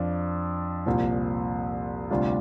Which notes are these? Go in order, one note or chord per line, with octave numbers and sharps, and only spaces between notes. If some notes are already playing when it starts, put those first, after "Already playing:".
Already playing: F2 F3 D4
C2 A#2 F3
D2 C3 G3 D4 F4